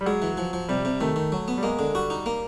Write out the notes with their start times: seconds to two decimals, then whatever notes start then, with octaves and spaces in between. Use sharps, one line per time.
0.01 G3
0.06 F#3 G#3
0.22 E3
0.38 F3
0.53 F3
0.69 C3 G3
0.85 C3
1.01 D#3 A3
1.16 D#3
1.32 F#3
1.48 B3
1.58 G3
1.63 G#3 A#3
1.79 D3
1.94 G3 F#4
2.10 D#4
2.26 A#3